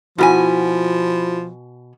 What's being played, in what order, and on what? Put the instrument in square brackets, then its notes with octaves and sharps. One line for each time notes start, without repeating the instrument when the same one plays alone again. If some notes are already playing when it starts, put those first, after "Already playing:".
[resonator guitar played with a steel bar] B2 A#4 G#5 [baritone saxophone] F3 [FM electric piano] E4 F#4 B5